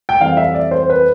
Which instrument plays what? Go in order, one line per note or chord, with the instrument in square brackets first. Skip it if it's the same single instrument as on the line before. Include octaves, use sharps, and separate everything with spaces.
[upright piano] G5
F2 E3 G3 C4 F5
E5
D5
C5
B4